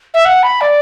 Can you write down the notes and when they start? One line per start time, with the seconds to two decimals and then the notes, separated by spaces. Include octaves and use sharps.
0.14 E5
0.25 F#5
0.43 B5
0.61 D5